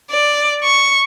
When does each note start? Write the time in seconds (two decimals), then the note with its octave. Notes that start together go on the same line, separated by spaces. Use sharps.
0.11 D5
0.64 C#6